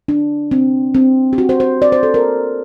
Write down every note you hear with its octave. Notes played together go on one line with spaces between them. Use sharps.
D4
C4
C4
G4
F#4
C5
C5
D5
C5
A4
A#4